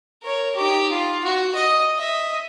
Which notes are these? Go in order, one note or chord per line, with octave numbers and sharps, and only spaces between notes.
A#4 C#5
D#4 G4
F4
F#4
D#5
D#5 E5